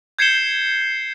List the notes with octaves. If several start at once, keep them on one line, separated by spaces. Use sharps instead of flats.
G6 G#6 C7 C#7 E7 G7